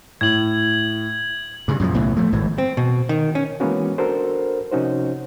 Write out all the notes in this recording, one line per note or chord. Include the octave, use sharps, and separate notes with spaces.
A2 G#6 F#7
G2 C#3
F#2 A#2 E3 F3
B1 A2 C#3 B3
F3 A3
G#1 A2
C4
B2
D#3
C#4
E3 G#3 A#3 B3 C#4 F#4
D4 F#4 A4 A#4 C5
C3 F3 C#4 D#4 F#4 C5